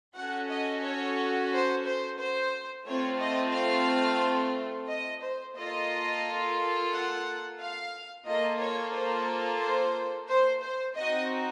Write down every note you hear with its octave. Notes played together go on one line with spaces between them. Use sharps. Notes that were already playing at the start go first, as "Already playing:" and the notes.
C#4 F#4 A4 F#5
D#5
C#5
C5
C5
C5
A3 C4 F4 A4 C#5
D#5
F5
D#5
C5
A#3 F4 A4 D#5
F#5
F5
A#3 F4 A4 D#5
C#5
C5
C5
C5
C5
C4 D#4 F#4 D#5